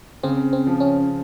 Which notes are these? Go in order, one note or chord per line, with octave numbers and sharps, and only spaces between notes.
C#3 C4
C4
F3
C#4